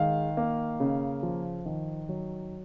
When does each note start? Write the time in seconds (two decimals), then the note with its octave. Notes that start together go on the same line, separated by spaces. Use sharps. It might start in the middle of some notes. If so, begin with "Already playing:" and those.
Already playing: D#3 G#3 F5
0.37 A#3
0.80 C#3
1.23 F3
1.66 D#3
2.09 F#3